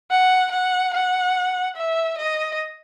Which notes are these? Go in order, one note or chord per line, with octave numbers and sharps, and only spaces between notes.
F#5
F#5
F#5
E5
D#5